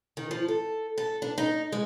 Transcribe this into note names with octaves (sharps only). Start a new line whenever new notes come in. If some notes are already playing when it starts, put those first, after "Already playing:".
D#3
F3
A4
A4
D4
D#4
G#3